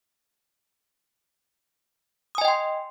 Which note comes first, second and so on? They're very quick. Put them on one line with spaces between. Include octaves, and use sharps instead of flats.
D#6 G#5 D#5 G5 C6